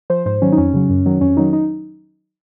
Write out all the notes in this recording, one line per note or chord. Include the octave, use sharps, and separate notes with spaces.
F3 C5
G#2 C5
D#3 F#3 C#4
D#4
F2 C#4
C#3 F#3
F#2
D#3 F#3
F2 C#4
D#3 F#3 D#4
D#4